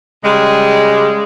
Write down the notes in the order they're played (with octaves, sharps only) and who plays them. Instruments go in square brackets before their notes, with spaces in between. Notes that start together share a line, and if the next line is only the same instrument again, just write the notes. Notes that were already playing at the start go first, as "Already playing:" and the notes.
[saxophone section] C#3 G3 G#3